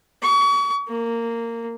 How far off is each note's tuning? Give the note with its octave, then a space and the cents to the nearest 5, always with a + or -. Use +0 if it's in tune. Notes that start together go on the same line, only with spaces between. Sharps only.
C#6 +35
A#3 -15